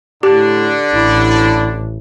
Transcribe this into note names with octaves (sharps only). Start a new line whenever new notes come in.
A2 D3 D4 G4
A1 E4